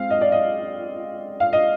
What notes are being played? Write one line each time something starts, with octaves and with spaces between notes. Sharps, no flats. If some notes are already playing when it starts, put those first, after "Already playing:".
Already playing: G#3 C4 F5
D#5
D5
D#5
F5
D#5